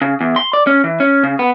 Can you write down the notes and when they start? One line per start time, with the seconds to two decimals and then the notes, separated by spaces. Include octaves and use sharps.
0.02 C#3
0.21 E2
0.36 C6
0.53 D5
0.67 C#4
0.84 E3
1.00 C#4
1.24 C#3
1.39 B3